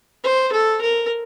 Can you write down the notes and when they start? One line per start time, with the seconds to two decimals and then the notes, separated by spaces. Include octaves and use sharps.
0.24 C5
0.52 A4
0.82 A#4